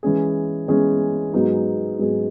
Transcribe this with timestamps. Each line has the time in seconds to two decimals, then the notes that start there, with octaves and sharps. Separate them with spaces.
0.03 E3 G#3 C#4 G#4
0.68 E3 G#3 C#4 G#4
1.33 G#2 F#3 B3 D#4 G#4
1.99 G#2 F#3 B3 D#4 G#4